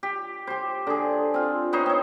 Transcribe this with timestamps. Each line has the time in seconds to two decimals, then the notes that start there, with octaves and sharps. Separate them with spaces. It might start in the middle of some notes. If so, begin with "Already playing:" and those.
0.03 G4
0.47 G4 C5
0.87 D3 G#4
1.34 C4 F4
1.73 B3 D#4 C5 C#5
1.86 C4 C#5